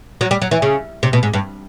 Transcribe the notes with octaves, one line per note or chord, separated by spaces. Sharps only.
F#3
G3
F#3
E3
C#3
C3
B2
G#2
G2